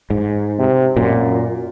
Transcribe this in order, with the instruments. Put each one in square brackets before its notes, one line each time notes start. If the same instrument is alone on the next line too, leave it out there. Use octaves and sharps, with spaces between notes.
[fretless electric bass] G#2
[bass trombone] C3
[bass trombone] F#2 [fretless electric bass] A#2